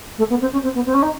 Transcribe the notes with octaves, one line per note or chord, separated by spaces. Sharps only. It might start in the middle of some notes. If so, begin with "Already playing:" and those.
A3
B3
C4
C#4
C4
B3
C4
C#4
D#4